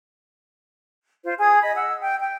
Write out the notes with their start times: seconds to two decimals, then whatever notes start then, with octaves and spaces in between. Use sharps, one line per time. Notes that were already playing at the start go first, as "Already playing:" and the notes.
1.23 F4 C5
1.39 G#4 G#5 D#6 G#6
1.62 D#5 B5
1.75 F#5 E6
2.00 G5
2.19 G5